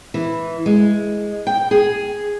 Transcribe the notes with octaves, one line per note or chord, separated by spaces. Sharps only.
E3
G#3
G5
G#4